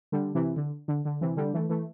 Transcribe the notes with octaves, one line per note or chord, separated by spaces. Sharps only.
D3 G3
C3 E3
D3
D3
D3
C3 E3
D3 G3
E3 A3
E3 A3